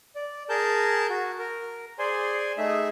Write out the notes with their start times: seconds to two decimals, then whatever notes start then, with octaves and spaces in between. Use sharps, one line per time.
0.16 D5
0.49 G#4 A#4 A5 G6
1.10 F#4
1.39 A#4
1.99 G#4 C5 D5 G#5 C6
2.58 A3 D#4 G#4 E5